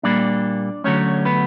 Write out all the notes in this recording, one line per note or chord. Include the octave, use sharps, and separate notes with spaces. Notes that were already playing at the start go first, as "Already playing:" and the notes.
A#2 G3 A#3 D4 D5
D3 F#3 A3 C#4 C#5
B3 B4